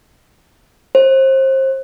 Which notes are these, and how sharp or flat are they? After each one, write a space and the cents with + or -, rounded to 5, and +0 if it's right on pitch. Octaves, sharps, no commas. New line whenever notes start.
C5 +30